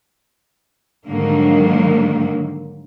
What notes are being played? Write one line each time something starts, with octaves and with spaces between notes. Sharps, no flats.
G#2 D3 D#3 F#3 G3 A#3